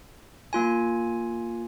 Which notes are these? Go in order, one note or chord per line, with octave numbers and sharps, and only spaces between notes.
A#3 F4 G#5